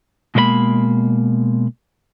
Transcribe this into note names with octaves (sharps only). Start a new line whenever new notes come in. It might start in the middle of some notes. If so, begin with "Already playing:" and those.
B2 G#3 A#3 C5 B5